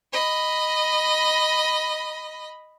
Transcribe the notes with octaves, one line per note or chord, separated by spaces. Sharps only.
D#5 B5